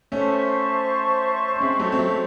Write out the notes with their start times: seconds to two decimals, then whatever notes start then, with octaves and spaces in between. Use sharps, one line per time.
0.12 A3 C#4 C5 E5 A5 C#6
1.55 C#4
1.61 G#3 C4
1.79 F#3 A3
1.92 C4
1.99 F#3 A3